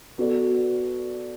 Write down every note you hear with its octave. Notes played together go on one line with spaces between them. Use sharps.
B3 F#4 A4 D5